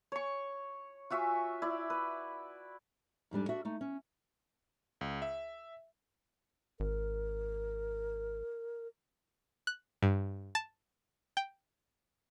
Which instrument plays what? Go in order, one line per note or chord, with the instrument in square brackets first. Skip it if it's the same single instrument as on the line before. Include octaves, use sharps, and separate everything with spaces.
[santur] C#5 C#6
F4 F#4 E5 G#5
E4 D5
B4
[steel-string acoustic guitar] F2 G#2 G3 D4
D4 F#4 E5
A3 D#4
C#4
[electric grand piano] C#2
E5
[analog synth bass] G#1 [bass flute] A#4
[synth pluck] F#6
G2
A5
G5